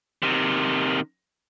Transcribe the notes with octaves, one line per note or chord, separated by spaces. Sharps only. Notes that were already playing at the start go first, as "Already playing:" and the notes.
C3 D#3